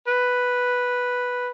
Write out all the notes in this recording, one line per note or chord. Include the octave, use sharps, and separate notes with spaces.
B4